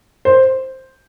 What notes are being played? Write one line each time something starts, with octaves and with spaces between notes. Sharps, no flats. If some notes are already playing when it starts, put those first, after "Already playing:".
C5